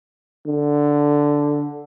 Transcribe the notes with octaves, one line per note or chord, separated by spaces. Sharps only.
D3